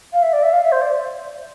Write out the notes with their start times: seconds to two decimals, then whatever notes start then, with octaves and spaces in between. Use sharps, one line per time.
0.13 F5
0.23 E5
0.33 D5
0.43 E5
0.53 F5
0.63 E5
0.72 C5
0.82 D5